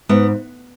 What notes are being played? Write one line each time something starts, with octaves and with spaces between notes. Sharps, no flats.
G#2 B3